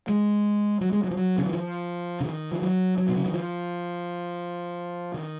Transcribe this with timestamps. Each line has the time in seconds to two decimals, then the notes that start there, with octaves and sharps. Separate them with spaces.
0.08 G#3
0.81 F#3
0.93 G#3
1.04 F#3
1.11 F3
1.17 F#3
1.38 C#3
1.46 D#3
1.53 F3
2.20 C#3
2.26 D#3
2.51 F3
2.62 F#3
2.98 F#3
3.08 B2
3.16 C#3
3.26 D#3
3.33 F3
5.14 D#3